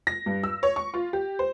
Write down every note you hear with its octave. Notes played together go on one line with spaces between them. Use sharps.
A#6
G2
E6
C#5
C#6
F4
G4
C5